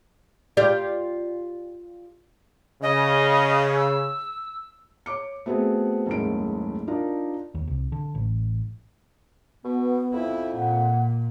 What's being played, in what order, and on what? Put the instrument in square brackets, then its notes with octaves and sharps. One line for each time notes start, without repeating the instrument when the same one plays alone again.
[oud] F4 G4 D5
[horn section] C#3 [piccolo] D#5
[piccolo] E6
[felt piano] C#5 D6 C#7
A3 B3 C4 F#4 G#4
F#1 D#2 G#2 A3 C#4 D7
D4 D#4 F4 A#4 D5
[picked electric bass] D#2
C2
D3
A1
[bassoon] B2 [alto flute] B3
[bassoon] F2 [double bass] E4
[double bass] A#2 [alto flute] F#5